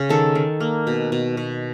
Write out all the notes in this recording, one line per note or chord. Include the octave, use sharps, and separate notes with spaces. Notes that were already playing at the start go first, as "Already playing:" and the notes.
Already playing: C#3
D#3 A4
D#3
A#3
B2
B2
B2